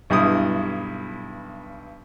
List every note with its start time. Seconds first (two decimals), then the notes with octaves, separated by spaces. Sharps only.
0.10 B1 G2 E4 D#6